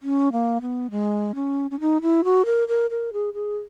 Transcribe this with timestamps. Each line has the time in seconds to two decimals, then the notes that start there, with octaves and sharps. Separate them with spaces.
0.03 C#4
0.32 A#3
0.61 B3
0.91 G#3
1.35 C#4
1.71 C#4
1.80 D#4
2.02 E4
2.24 F#4
2.45 A#4
2.68 A#4
2.90 A#4
3.13 G#4
3.34 G#4